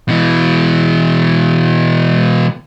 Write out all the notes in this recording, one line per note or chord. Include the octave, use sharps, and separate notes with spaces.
B2 E3